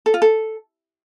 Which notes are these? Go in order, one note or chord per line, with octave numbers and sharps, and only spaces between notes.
A4
F4
A4